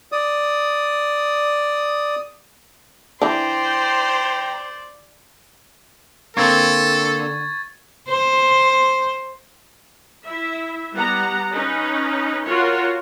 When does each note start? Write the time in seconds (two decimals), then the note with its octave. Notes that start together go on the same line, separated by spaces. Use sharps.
0.12 D5 D#6
3.22 E3 D4 C5 D5 G5 A#5
6.37 D3 A#3 C4 A4 C#6 G#6 A6
8.08 C5
10.24 E4 E5
10.95 G3 B3 F#5 A#5
11.52 C#4 D#4 B4
12.45 F4 F#4 A#4 C#5